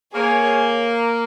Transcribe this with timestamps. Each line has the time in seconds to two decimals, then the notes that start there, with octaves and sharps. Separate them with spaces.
0.13 A#3 G#4 C#5 G#5